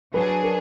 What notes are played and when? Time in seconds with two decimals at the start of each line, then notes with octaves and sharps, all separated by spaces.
0.14 F#3 D4 G#4 B4
0.43 A#4